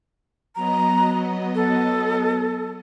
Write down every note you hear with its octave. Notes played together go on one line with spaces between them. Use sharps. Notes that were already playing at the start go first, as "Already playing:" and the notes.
F#3 B3 D#5 A#5
A4